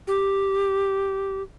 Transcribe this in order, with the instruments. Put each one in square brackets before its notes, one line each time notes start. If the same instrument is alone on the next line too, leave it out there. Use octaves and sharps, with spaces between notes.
[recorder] G4